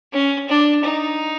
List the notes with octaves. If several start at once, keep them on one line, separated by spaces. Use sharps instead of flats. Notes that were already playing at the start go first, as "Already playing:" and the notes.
C#4
D4
D#4